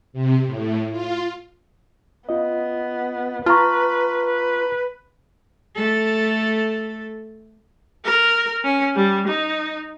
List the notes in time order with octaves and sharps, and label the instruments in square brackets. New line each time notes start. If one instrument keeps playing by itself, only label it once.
[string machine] C3
A2
F4
[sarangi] B3 [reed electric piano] F4 D#5
[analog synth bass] F4 [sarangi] B4 [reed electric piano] A5 A#5 [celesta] C#6 F6
[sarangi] B4
[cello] A3 A4
[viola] A#4
C#4
G3
D#4